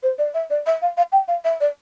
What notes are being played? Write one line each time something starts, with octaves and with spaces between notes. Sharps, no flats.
C5
D5
E5
D5
E5
F5
F5
G5
F5
E5
D5